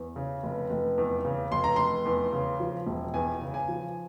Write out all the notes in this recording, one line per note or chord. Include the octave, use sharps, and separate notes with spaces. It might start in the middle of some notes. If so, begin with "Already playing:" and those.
Already playing: E2
C#3
F1
F1
E2
C#3
F1 C6
A#5
F1 C6
E2
C#3
F3
E1
E2 G#5
C#3
G#5
F3